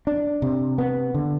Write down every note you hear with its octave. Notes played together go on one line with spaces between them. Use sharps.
D4
C3
B3
D3